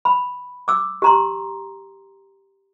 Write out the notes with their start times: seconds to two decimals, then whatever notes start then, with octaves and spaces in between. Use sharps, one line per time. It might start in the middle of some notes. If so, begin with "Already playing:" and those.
0.05 B5
0.68 D6 E6
1.02 G4 A#5 C6